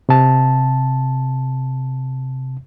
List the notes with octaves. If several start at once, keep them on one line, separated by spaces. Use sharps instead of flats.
C3 A5